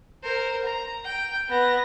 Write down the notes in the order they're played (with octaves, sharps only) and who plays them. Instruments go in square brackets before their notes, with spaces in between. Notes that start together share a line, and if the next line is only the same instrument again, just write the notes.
[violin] A#4 C5
A#5
G5
B3 A#6